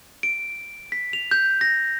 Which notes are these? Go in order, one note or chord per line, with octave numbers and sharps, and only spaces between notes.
D7
B6
F7
G6
A#6